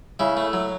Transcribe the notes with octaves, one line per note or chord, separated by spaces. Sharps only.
C#3 E4
A3
F#3